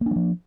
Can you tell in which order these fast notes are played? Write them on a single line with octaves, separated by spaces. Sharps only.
A#3 D4 F#3 F3